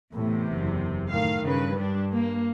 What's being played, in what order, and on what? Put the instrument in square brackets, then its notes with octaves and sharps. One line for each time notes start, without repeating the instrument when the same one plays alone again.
[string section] E2 C3 [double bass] A2
[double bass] F#1
[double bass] A2 D#3 [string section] F5
[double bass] G2 [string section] C#3 B4
[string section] G3 D4
A#3